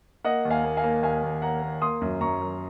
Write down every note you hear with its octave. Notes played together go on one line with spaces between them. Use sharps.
A#3 D#5 F#5
D#2
F5 G#5
A#3
F5 G#5
A#3
D#2 F5 G#5
D#2
A#3 F#5 A#5
A#3
A#3 C6 D#6
F#2
F#2 A#5 C#6
F#2